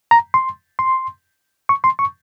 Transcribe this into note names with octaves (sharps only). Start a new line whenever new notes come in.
A#5
C6
C6
C#6
C6
C#6